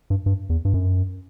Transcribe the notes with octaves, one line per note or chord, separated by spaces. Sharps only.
G2
G2
E2
G2
F#2